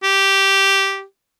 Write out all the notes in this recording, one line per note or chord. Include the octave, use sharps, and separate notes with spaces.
G4